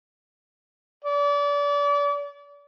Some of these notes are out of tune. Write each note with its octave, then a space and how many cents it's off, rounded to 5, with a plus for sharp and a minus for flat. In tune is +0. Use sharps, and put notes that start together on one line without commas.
D5 -35